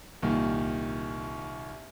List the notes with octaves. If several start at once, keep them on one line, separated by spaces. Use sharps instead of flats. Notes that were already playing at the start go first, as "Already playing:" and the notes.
C2 A#2 D#3 A#3